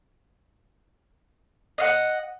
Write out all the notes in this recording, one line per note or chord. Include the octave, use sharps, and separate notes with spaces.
D#5 F5 F#5